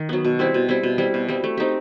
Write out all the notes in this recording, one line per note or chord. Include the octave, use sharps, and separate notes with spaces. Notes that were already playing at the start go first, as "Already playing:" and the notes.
Already playing: D#3
F#3 B3
B2
G3 C4 E4
B2
G3 C4 E4
B2
G3 C4 E4
B2
G3 C4 E4
A3
C4 D#4 G4